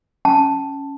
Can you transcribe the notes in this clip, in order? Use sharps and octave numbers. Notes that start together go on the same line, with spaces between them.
C#4 A5